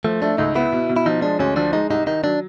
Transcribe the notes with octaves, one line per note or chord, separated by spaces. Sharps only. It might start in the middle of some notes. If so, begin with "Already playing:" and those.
F3 A3
A3 D4
C#2 D#4
B3 E4
B2
B2
E4
F3 D#4
G#3 D4
D2 C#4
F3 D4
G#3 D#4
C2 D#4
D#3 D#4
F#3 D4